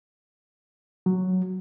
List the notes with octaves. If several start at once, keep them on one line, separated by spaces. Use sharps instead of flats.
F#3